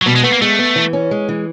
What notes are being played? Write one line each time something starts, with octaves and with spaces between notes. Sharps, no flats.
F#3
B2 G3
G#3
A3 B3
A#3
G#3 A3
B3
E3
C#4
G#3
E3